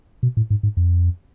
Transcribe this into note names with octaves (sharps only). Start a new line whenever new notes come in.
B2
A2
G#2
G#2
F2